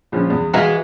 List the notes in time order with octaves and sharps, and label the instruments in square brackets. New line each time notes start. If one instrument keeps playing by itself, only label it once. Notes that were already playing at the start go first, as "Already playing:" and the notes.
[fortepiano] A#1 F3 C#4
E2
[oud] E3 G#3 F#4 [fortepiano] F5 F#5 A#5